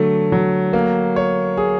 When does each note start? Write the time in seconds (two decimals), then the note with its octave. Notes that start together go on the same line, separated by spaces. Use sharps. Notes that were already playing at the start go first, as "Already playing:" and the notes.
Already playing: D3 F#3 A3
0.32 F#3
0.73 A#3
1.16 C#5
1.57 G#4